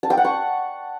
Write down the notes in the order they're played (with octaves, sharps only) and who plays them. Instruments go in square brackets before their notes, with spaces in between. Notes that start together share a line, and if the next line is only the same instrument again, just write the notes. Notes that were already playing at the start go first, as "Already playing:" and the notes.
[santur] A5
G5
F#5
C#6